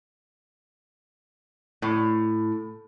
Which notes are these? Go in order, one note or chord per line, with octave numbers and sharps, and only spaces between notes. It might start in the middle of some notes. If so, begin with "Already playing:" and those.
A2